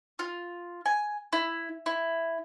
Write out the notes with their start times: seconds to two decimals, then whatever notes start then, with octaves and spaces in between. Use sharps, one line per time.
0.19 F4
0.86 G#5
1.33 E4
1.86 E4